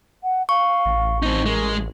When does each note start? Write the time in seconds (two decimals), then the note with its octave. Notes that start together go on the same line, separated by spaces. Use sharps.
0.23 F#5
0.49 F5 C#6
0.85 A1
1.23 C4 D#4
1.46 G#3 A#4